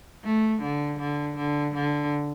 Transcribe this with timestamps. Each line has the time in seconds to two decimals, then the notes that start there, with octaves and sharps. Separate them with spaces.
0.24 A3
0.62 D3
0.99 D3
1.36 D3
1.74 D3